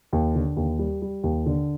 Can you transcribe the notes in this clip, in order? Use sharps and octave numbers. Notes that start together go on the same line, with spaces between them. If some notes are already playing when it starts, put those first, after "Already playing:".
D#2
D3
D#2
G3
G3
D#2
D3